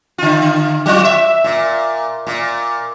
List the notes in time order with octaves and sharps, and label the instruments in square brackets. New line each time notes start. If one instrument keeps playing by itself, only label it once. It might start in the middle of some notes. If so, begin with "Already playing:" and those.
[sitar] D3 F4
F#3 F4
E5
A#2
A#2